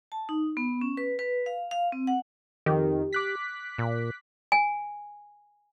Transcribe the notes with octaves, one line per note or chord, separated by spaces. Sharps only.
A5
D#4
B3
C#4
B4
B4
F5
F5
C4
F#5
F2 D#3 G4
D6 F#6 B6
A#2
G#5